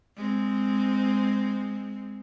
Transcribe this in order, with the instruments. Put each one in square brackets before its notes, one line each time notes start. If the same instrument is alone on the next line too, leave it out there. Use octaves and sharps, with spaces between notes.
[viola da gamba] G#3 C4